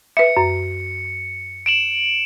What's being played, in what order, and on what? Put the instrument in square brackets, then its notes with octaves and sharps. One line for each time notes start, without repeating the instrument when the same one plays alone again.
[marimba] B4 E5 [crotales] C#7
[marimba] F#2
[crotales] D7 E7 F#7